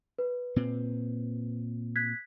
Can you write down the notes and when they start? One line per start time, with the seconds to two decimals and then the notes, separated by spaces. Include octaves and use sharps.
0.19 B4
0.56 A#2 C4
1.96 F#6 G#6 B6